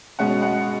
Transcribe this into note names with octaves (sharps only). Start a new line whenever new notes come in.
B2 G#3 C#4 F#5
F#5